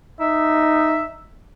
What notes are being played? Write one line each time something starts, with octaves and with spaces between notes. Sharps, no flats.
D#4 E5